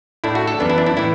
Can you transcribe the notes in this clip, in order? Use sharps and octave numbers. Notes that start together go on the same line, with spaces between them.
A2 A3 D4 E4
F#4
A4
F#2 E3 B3 D4
E4
D4
E4
A2 E3 E4